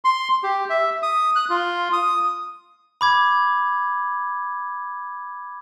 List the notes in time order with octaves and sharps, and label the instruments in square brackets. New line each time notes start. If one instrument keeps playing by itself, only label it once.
[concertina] C6
G4
E5
D#6
F#6
F4
D#6
[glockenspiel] B5 D6 G#6